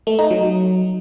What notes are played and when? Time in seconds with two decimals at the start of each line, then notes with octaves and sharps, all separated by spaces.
0.07 A3
0.19 D#4
0.30 F#3